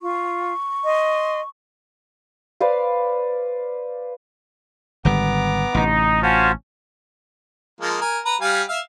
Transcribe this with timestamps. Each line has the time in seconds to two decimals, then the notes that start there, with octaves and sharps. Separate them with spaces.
0.01 F4 C#6
0.86 D#5 C6
2.60 B4 C5 D5 F5
5.05 G#1 D3 G3 B3 A#5 D6
5.75 A1 C3 D#4
6.23 C#4 F4 F#4 C5 A5
7.81 F3 G#3 A#3
8.01 A#4 G#5
8.25 B4 A#5
8.41 G3 F5 G#5
8.68 E5 F5